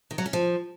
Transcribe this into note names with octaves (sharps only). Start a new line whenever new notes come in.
D#3
F#3
C#4
F3